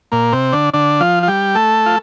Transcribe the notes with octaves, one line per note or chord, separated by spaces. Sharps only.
A#2 A#3
C3 C4
D3 D4
D3 D4
F3 F4
F4
G3 G4
A3 A4
F4